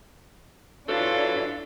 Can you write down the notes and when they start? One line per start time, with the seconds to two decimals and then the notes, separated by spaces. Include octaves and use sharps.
0.89 E3 F#3 D4 E4 F4 A4